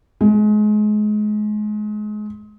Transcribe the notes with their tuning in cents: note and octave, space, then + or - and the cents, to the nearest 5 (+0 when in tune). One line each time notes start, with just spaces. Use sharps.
G#3 +30